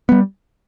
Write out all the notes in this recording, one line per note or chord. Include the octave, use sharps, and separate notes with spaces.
G3 B3